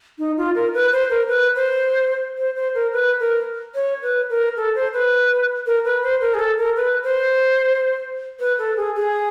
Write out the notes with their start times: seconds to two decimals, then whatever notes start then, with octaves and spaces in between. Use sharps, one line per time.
0.19 D#4
0.37 F4
0.55 A#4
0.74 B4
0.92 C5
1.10 A#4
1.28 B4
1.56 C5
2.38 C5
2.56 C5
2.75 A#4
2.93 B4
3.20 A#4
3.75 C#5
4.02 B4
4.30 A#4
4.57 A4
4.75 C5
4.93 B4
5.67 A#4
5.85 B4
6.03 C5
6.21 A#4
6.34 G#4
6.39 A4
6.58 A#4
6.76 B4
7.04 C5
8.40 B4
8.59 A4
8.77 G#4
8.95 G#4